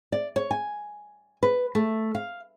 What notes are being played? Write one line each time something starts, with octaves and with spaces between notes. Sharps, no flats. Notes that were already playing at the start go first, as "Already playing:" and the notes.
D5
C#5
G#5
B4
A3
F5